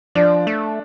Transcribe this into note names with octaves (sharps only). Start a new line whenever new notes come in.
F3 D4
A3